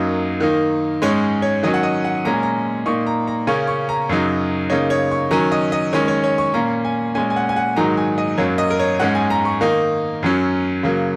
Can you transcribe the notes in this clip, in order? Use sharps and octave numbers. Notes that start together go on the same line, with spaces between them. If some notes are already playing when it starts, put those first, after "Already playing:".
Already playing: F#2 F#3 A#3 D#4
D#3 A#3 D#4
G#2 G#3 C#4 C#5
C#5
D#3 F#3 C#4 D#5
F#5
D#5
F#5
A#2 G#3 C#4 A#5
G#5
A#5
A#2 A#3 D#4 C#6
A#5
A#5
C#3 A#3 C#4 C#6
C#6
A#5
F#2 C#3 F#3 D#4
C#3 A#3 D#4 C#5
C#5
C#6
D#3 F#3 C#4 A#5
D#5
D#5
D#3 G#3 C#4 C#5
C#5
C#5
C#6
A#2 A#3 C#4 A#5
G#5
A#2 G#3 C#4 G#5
G#5
F#5
G#5
F#5
G#2 D#3 F#3 D#4 A#5
G#5
D#5
F#2 F#3 A#3 C#5
D#5
A#4
C#5
G#2 G#3 C#4 F#5
G#5
A#5
C#6
D#3 A#3 D#4
F#2 F#3 C#4
C#3 F#3 A#3